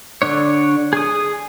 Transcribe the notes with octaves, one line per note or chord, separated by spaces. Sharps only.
D3 D4 C#5
G#4 D#6